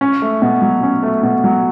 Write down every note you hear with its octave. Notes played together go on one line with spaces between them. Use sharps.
C#4
A3
B2
F#3
C#4
A3
B2
F#3